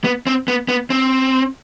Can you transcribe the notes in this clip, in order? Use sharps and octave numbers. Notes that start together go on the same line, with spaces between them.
B3
C4
B3
B3
C4